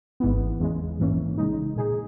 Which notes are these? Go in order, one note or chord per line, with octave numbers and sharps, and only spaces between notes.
G#1 G#2 E3 B3
E2 C#3 G#3
A#1 G#2 E3 A#3 C#4
C#3 G#3 D#4
A#2 G#3 D#4 G#4